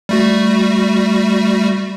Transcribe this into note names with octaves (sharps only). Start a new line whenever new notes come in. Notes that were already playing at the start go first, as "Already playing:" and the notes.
G3 A3 F#4